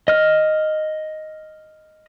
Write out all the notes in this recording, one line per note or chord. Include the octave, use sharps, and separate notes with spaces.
D#5 F6